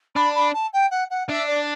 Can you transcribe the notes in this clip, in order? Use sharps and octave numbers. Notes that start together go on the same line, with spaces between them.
D4 B5
B5
A5
G5
F#5
F#5
D4 E5
D5